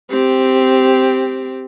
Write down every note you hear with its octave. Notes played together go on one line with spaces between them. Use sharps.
C4 G4